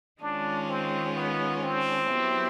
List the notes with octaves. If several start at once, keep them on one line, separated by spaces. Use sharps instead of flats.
D#3 G#3 C#4 D4 F4
C4
B3
C4
F#3 B3 E4 G4